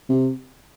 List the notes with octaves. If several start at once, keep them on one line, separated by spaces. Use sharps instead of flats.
C3